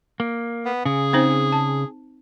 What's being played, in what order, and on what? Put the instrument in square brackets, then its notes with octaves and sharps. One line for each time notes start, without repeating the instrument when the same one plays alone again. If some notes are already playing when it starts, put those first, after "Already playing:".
[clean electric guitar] A#3
[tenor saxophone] B3
[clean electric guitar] C#3 [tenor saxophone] G#4
[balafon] C4 D#4 C5
A5